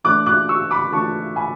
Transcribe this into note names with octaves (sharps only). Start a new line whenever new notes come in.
E3 A3 D4 D6 F#6
D6 F#6
C#6 E6
B5 D6
E3 A3 D4 A5 C#6
G#5 B5